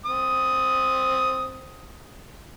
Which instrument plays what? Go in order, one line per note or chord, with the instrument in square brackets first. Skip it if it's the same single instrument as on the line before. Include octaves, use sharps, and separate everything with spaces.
[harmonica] C4 D#6